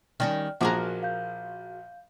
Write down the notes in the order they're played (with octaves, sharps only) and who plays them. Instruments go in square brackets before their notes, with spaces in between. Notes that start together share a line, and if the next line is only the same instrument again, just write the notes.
[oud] D#3 G3 C#4 [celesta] D5 G5 F6
[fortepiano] A#1 F3 D6 [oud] F#4 G#4 A#4 [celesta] F#5
[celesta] F5 G6